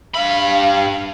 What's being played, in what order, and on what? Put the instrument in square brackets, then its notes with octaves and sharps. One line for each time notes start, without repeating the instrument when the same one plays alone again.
[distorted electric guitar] G2 B5 [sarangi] F5